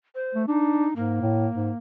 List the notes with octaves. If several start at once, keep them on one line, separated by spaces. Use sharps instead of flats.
C5
A3
D4 D#4
G#2 A#3
A2
G#2